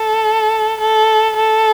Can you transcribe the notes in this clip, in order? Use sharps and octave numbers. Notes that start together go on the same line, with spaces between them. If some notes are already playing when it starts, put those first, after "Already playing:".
Already playing: A4
A4
A4